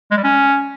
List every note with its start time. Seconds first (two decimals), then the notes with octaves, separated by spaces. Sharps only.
0.11 G#3
0.17 G3
0.24 C#4